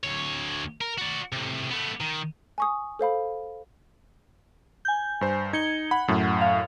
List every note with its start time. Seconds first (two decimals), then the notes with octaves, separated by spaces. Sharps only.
0.03 D2 C#5
0.81 A#4
0.98 F#4 D5
1.33 A2 C3
1.71 A3 B3
2.01 D#3
2.58 G#5 C#6 D#6
2.99 A4 C5 F5 B5
4.85 G#5 G6
5.21 G2 C5
5.53 D#4 G#6 C#7 G7
5.91 F#5 B5
6.08 F#2 A2
6.41 F5